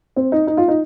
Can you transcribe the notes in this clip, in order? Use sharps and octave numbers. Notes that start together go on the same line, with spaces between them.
C4
D#4
D#4
F4
D#4